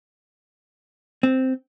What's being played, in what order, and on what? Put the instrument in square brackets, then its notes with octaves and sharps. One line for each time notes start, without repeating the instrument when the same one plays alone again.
[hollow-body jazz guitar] C4